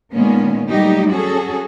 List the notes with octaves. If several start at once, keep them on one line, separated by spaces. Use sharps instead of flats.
A#2 D#3 G#3 A#3 B3 C#4
F#3 G3 A3 A#3 D#4 G4
C#4 F#4 G#4 A4